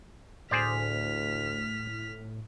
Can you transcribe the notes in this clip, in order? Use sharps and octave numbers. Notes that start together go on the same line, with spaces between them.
D2 A2 G#4 C5 D5 F6 B6